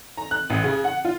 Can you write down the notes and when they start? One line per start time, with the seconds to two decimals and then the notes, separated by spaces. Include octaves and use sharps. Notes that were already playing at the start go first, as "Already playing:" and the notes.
0.17 A#5
0.31 F#6
0.50 A1
0.64 C#3
0.84 F#5
1.05 F4